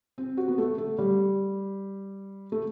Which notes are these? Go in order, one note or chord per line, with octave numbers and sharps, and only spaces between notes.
C4
F#4
B3
A3
A3
G3
A3